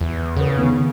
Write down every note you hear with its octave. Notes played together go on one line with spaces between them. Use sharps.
E2
C#3 B4 F#5
D#3 B3